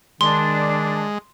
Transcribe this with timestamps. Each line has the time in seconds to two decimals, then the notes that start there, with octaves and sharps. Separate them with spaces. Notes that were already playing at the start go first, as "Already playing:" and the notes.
0.21 D#3 G#3 D4 C6